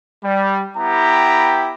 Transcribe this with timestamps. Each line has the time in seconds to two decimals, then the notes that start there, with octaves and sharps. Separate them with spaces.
0.23 G3
0.77 B3 E4 G4 G5 A#5